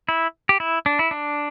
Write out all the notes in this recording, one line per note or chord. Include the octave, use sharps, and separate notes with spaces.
E4
G4
E4
D4
E4
D4